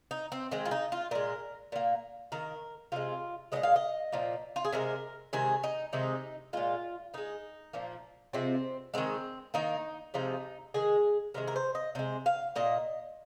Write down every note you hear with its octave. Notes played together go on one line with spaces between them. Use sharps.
D#4
C4
D#3 G#3 C4
F4
D#4
F4
A#2 G#3 A#4
A#2 A#3
D#3 A#3 A#4
C3 G#3 F4
A#2 F3 G#3 D#5
F5
D#5
A#2 F3 A#3
F4
G#4
C3 G#3 A#4
C3 D#3 G#3 G#4
D#4
C3 D#3 G#3 D#4
A#2 G#3 F4
D#3 G#3 D#4
A#2 F3 A#3
C3 F3 G#3 C4
D#3 G#3 C4
D#3 A#3 D#4
C3 F3 G#3 D#4
D#3 G#3 G#4
C3 D#3 G#3 A#4
A#4
C5
D#5
C3 G#3 C5
F5
A#2 A#3 D#5